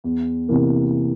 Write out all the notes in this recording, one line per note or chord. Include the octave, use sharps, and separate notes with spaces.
E2
C3 E3 A#3